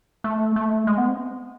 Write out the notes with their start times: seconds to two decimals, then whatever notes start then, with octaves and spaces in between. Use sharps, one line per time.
0.24 A3
0.56 A3
0.87 G#3
0.98 B3
1.08 C4